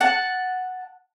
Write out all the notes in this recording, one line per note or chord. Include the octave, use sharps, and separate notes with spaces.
F#5 A5